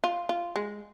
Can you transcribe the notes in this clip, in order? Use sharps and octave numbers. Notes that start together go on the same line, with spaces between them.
F4
F4
G#3